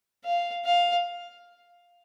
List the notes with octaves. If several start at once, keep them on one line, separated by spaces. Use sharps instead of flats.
F5
F5